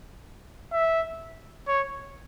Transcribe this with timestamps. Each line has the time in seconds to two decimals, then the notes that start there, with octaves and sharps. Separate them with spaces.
0.73 E5
1.68 C#5